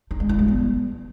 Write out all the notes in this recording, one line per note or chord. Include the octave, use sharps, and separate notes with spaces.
D#4
G#3
E4
G3
B3